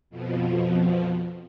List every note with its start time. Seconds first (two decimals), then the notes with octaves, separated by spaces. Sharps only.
0.10 F2 B2 F3